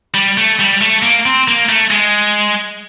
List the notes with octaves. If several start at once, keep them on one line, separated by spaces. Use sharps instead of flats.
G3
A3
G3
A3
A#3
C4
A#3
A3
G#3